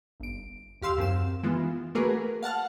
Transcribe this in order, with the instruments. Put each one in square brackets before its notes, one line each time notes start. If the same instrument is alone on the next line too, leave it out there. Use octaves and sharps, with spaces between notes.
[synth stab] G1 D7
D#2 G4 F5 C6 E6
F#2 C4 E7
E3 G#3 B3 F4
A3 A#3 F#4 G#4 A#4 B4
F5 F#5 A5 F6